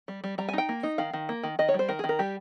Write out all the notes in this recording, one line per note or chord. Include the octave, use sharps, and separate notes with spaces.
G3
G3
G3 A#5
G#5
D#4 G5
A#3
D#4
D#3 F5
D#3
A#3
D#3
D#3 D#5
C#5
G3 C5
D#3 A#4
G#4
D#3
A#4
G3 G4